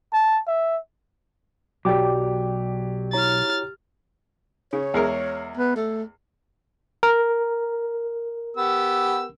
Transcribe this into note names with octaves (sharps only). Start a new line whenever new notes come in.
A5
E5
B1 F#3 G4 D5 G5 D6
E4 C#5 A#5 F6 A6
C#3 C#5
E2 G#3 A#4
B3
A3
A#4
B3 G4 E6